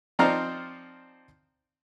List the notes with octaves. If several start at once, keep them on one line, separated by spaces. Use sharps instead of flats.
F3 C4 D#4 D5 A#5 F6